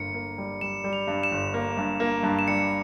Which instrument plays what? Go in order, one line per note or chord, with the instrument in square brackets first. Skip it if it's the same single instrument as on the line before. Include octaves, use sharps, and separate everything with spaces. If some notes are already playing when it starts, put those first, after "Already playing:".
Already playing: [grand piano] G1 A#3 [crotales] C#7
[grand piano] A#3
G3
[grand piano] G3 [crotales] E7
[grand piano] G3
[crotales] F7
[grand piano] G2
[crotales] E7
[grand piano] G1
A#3
G2
A#3
G2
[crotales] E7
[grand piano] G3 [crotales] C#7